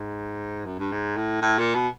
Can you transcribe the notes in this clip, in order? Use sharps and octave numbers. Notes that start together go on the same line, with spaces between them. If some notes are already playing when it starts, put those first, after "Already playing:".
Already playing: G#2
F#2
G2
G#2
A2
A2
A#2
B2